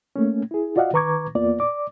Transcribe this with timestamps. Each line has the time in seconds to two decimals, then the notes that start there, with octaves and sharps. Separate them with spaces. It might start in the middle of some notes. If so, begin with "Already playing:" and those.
0.16 A3 A#3 C#4
0.51 E4 G#4
0.76 F4 F#4 D5 D#5 F5 F#5
0.93 D#3 B4 A#5 C#6 D6 G#6
1.35 E2 A#3 B3 F4 D5
1.60 D5 D6